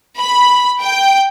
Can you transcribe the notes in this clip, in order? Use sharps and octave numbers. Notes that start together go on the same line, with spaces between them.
B5
G5